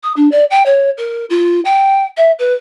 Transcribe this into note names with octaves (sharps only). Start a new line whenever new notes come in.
D#6
D4
D5
G5
C#5
A#4
F4
G5
E5
B4